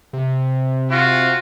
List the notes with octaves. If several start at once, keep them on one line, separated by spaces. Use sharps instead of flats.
C3
F4 F#4